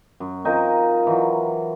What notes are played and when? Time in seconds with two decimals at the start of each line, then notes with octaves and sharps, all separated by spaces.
0.20 F#2
0.45 C4 D#4 F4 A#4
1.07 E3 F#3